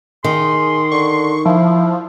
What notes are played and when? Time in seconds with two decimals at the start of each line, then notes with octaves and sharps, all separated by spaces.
0.24 D#3 G#4 C6
0.92 D3 C#6
1.45 F3 E4